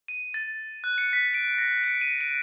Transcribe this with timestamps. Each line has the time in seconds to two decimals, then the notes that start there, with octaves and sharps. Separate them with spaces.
0.08 D#7
0.34 A6
0.84 F#6
0.98 C#7
1.13 B6
1.34 D7
1.58 A#6
1.84 C#7
2.01 D#7
2.21 D7